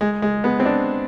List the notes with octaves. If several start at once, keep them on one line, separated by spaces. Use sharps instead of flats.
G#3
G#3
B3
C4
D4